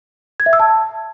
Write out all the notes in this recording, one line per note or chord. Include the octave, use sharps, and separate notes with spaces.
G#6
E5
E6
A5